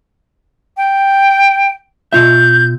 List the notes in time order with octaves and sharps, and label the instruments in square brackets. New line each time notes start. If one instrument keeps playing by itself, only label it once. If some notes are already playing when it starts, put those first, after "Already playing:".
[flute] G5
[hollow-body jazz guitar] B2 F4 E5 [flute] G6